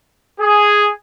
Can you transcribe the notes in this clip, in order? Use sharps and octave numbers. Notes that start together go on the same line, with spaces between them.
G#4